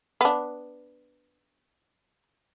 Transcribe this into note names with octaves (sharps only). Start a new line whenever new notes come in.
B3 D4